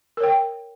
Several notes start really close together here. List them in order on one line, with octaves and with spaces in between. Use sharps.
A#4 C#5 G5